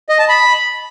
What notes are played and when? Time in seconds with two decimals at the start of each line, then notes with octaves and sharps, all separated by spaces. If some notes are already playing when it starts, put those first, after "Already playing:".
0.09 D#5
0.19 A5
0.29 B5